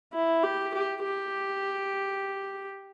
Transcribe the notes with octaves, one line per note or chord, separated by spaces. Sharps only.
E4
G4
G4
G4